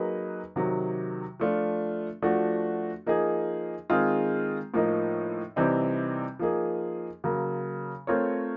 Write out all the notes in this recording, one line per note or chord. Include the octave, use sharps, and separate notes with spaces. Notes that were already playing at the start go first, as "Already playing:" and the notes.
Already playing: F#3 A#3 D#4 G#4 B4
C3 D#3 F#3
F3 A3 D4 F4
F3 A3 D4 F#4
F3 A#3 D#4 G#4
D#3 G#3 C4 F4 G#4
A2 F3 A#3 D#4
C3 E3 G3 C4 D#4
F3 A#3 D#4 G#4
C#3 F#3 A#3
A3 C4 F4 A#4 C#5